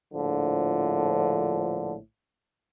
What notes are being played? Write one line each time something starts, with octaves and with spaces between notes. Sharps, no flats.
A#1 A2 D3 F3